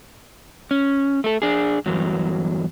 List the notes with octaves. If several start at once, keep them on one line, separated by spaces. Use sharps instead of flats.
C#4
A3 A4
D4 G#4
E2 G2 F#3